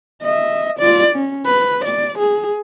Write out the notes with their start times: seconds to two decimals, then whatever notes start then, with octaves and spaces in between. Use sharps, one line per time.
0.22 D#5 E5
0.79 F4 D5
1.15 C#4
1.45 B4
1.84 D5
2.18 G#4